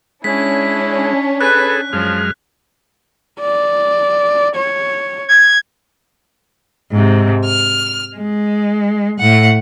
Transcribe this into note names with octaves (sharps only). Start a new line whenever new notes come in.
G#3 C#4 D4 E4 B6
G#4 A4 B4 F#6
F#2 F3 G#3 F6
D5
C#5
G#6
G#2 C3
F6
G#3
A2 F#5